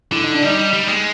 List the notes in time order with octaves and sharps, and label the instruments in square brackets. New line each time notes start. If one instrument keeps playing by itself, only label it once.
[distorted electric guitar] D3 [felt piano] E4
[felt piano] D#4
D4
[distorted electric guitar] G3 [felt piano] D#4
[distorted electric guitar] G3
G#3